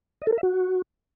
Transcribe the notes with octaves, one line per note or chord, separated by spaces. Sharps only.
D#5
A4
A#4
E5
F#4